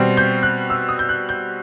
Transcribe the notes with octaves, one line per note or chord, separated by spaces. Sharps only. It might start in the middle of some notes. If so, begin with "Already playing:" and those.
Already playing: B2 G3 C4
G6
F#6
E6
D#6
G6
F#6
G6